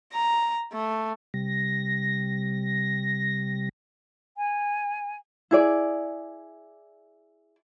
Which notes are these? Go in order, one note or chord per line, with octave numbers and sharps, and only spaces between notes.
A#5
A3
C3 G3 A#6
G#5
E4 G#4 D5